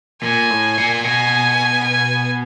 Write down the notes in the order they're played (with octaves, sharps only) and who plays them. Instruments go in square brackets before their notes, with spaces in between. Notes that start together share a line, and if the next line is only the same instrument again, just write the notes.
[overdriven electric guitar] A#2 [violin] G#5
[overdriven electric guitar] A2
A#2
[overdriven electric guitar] B2 [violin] G#5
[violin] G#5